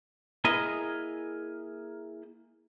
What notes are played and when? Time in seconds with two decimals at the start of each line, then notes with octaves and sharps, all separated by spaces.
0.44 A#3 E4 G#4 A#4 D#5